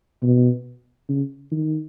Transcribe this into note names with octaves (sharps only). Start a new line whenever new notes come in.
B2
C#3
D#3